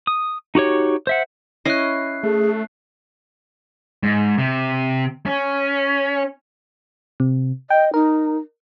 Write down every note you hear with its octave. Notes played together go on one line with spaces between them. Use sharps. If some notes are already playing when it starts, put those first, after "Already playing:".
D#6
D#4 F#4 G4 C#5
C5 E5 F#5
C#4 E4 D#5 F#6 C7
A3 G#4
G#2
C3
C#4
C3
D#5 G5
D#4 A#4